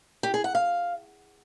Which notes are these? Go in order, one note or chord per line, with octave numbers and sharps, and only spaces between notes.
G4
G#4
F#5
F5